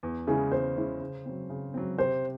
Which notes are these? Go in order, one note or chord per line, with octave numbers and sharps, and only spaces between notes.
E2
C#3 G#3 C#4 E4 G#4
E2 C5
C#3 G#3 C#4 E4
C#3
F#3 C4
C#3
F#3 C4
C3 C5